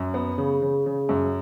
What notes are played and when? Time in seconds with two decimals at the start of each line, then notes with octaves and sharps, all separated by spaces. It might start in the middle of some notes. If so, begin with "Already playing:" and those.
Already playing: F#2
0.14 B3
0.38 C#3
0.62 C#3
0.86 C#3
1.09 F#2